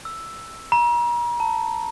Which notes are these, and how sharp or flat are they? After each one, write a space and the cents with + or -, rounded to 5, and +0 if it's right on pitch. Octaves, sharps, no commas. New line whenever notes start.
E6 +5
A#5 +40
A5 +30